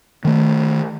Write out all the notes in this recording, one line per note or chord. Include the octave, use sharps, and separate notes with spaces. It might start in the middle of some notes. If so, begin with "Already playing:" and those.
D#3 A3